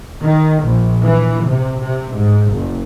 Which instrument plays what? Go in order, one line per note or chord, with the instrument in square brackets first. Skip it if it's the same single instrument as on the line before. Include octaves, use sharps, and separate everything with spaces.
[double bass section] D#3
A#1
E3
C3
C3
G#2
F#1